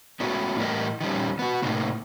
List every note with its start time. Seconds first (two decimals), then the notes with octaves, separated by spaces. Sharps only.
0.20 A3 B3 C#4 E4 F#4
0.58 A2 E3 G3 E4 A#4 D#5
1.01 D#3 F3 G3 C#4
1.39 B3 F#4
1.62 A2 C3 A#3 D#4